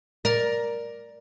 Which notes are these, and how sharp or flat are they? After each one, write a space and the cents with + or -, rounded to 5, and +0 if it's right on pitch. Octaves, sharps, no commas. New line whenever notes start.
A#4 +10 D5 +0